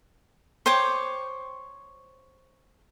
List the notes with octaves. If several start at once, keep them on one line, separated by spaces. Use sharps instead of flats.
C5 C#5 G5 D6